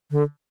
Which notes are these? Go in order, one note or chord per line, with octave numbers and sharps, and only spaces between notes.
D3